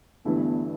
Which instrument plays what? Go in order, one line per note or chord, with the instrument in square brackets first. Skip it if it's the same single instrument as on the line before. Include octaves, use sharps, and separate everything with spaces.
[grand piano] G1 G2 E3 A3 E4 [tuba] B3